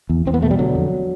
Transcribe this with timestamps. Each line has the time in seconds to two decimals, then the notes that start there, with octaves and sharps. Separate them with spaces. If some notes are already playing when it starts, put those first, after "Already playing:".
0.10 E2
0.26 E2 C4
0.34 B3
0.42 B2 A3
0.51 G3
0.59 D3 F#3
0.75 F2